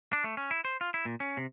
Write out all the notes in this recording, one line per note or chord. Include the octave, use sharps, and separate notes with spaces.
D4
A3
C#4
E4
C5
F4
E4
A#2
C#4
C3